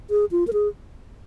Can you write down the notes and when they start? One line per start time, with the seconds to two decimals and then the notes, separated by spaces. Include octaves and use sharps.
0.10 G#4
0.31 F4
0.47 A#4
0.53 G#4